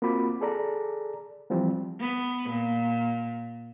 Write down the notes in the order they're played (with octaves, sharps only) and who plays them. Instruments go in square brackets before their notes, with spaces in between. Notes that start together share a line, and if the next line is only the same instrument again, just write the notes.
[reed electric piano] A#3 C4 F4 F#4 B5 D6
G#4 A4 D5 A#5
E3 F3 G3 C4
[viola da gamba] B3
A#2